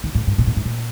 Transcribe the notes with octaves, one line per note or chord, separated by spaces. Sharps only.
D#3
A2
G#2
A#2
A2
G#2
A#2